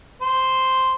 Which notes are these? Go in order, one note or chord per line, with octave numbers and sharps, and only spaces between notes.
C5